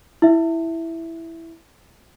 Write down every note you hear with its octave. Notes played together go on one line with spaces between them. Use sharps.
E4 E5